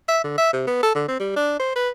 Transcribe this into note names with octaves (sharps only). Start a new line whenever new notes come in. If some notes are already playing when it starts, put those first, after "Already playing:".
E5
D3
E5
C3
B3
A4
D3
C4
G3
D4
C5
B4